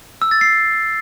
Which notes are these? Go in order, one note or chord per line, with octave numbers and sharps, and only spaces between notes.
E6
A6
C7